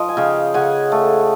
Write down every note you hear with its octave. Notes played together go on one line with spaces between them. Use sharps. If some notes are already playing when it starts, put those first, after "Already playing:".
Already playing: F3 D#5
G#5
C#3 F5 G5
C#3 F#5 G#5
A3